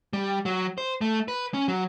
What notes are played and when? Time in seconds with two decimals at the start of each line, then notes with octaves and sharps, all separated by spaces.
0.13 G3
0.46 F#3
0.78 C5
1.01 A3
1.28 B4
1.54 C#4
1.68 F#3